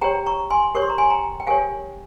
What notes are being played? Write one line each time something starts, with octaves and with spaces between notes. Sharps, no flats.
G4 C#5 G5 A#5
A#5 C#6
G#5 C6
G4 A#4 C#5 C#6
C6
A#5
G#5 C6
G5 A#5
G5
G4 A#4 C#5 F5 G#5